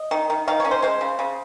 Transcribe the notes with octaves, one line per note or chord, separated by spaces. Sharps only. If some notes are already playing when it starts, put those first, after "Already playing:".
Already playing: D#5
D#3
D#3
D#3 F5
C#4 C#5
C5
G#3 C5
C#3
C#3